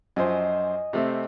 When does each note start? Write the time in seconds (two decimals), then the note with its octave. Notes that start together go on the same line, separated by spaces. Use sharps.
0.16 F#2 F3 C5 D#5 G#5
0.93 C3 A3 C4